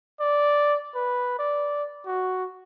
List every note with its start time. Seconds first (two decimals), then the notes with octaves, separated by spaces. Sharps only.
0.20 D5
0.95 B4
1.39 D5
2.06 F#4